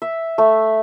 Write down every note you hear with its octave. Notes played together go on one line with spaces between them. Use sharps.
E5
A3